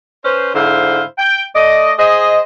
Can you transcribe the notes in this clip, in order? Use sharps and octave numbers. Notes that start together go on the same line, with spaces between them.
C#4 B4 C5
G#2 D3 E4 C5 F5
G5
A3 D5 D#5
G#4 C5 D#5